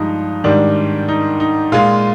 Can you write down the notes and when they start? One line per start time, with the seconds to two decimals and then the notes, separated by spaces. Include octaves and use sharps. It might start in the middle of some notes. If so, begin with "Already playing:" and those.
Already playing: G2 F3 G#3 D#4
0.44 G#2 D#3 G3 D4
1.08 D#4
1.40 D#4
1.72 A#2 G#3 F4